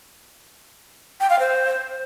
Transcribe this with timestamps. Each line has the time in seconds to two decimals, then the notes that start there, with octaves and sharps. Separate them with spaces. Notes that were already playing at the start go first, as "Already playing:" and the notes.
1.20 G5
1.30 F5
1.39 C5